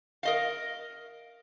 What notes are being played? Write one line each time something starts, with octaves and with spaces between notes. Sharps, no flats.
A#4 D#5 F5